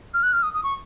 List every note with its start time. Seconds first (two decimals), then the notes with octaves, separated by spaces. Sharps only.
0.14 F6
0.23 F#6
0.33 F6
0.43 D#6
0.54 D#6
0.64 C#6